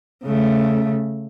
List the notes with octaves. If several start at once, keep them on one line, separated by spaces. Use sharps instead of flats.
C#3 A3